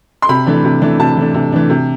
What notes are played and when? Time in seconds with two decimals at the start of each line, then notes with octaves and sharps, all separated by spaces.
0.22 C6
0.29 C3 B5
0.46 E3 A3 D4
0.65 C3
0.82 E3 A3 D4
0.99 C3 A5
1.17 E3 A3 D4
1.34 C3
1.52 E3 A3 D4
1.70 C3